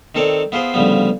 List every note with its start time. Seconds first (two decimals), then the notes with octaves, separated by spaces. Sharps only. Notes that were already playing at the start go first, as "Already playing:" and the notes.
0.15 D#3 C4 A4 C#5 D5
0.52 B3 E4 F4 G#4 C5
0.74 D2 C#3 F3 G3 B3